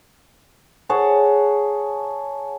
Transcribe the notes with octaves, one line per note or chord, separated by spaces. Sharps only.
G#4 C#5 F#5 A5